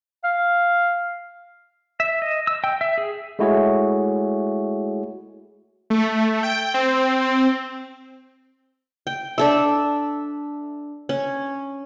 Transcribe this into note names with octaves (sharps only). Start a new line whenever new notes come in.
F5
E5
D#5
E6
G5
E5
G#4
G#3 A3 E4 F#4 G#4 C#5
A3
G5
C4
G5
D4 A4 E5
C#4